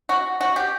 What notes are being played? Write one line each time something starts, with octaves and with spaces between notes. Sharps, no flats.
F#4
F#4
G4